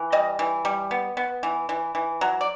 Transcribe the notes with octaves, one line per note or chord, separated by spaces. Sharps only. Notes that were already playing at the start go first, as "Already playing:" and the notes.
Already playing: E3
G3 D#5
E3
G3
B3
B3
E3
E3
E3
F#3
D5